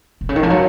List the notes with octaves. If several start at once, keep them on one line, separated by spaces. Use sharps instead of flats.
C3
C#3
D#3
F3
F#3